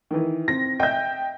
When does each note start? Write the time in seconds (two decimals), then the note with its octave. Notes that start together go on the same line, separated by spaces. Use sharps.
0.11 D#3 E3
0.48 C4 A#6
0.80 D#5 E5 G5 G6